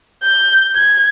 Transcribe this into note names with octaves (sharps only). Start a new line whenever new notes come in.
G6
G#6